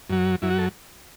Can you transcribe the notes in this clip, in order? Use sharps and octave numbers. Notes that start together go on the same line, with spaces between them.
F#2 F#3
F#2 F#3 E4
F#4
A4